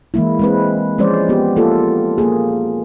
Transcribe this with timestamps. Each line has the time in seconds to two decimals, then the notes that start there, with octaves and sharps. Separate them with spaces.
0.14 E3 G#3 A#3 E4
0.39 G#3 C4 B4
0.98 F3 G#3 C#4 C5 D5
1.29 B3 G4
1.56 A#3 F4 A4
2.18 A#3 G#4